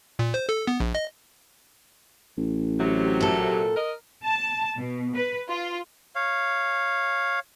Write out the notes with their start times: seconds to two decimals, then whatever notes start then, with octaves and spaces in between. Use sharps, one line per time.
0.19 A#2
0.34 C5
0.49 A4
0.67 B3
0.80 A#1
0.95 D#5
2.37 A1
2.79 C3 F#3
3.21 A#2 A4
3.75 A#4 D#5
4.24 A5
4.77 B2
5.15 B4
5.49 F4
6.15 C#5 F5